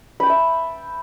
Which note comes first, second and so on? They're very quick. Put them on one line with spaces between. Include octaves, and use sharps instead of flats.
B5 G5 A5 E5